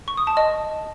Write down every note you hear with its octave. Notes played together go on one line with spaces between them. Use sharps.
C#6
D#6
A5
D#5